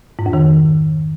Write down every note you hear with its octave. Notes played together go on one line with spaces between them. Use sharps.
G#2
F2
D#3